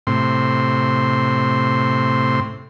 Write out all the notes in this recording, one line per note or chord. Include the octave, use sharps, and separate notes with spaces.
A2 C3 C6